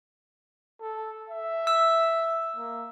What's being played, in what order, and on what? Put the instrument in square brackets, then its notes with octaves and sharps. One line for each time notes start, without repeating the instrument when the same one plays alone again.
[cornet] A4
E5
[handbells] E6
[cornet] A#3